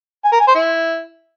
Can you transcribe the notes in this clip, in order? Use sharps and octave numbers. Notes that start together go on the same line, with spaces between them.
G#5
A#4
G#5
C5
E4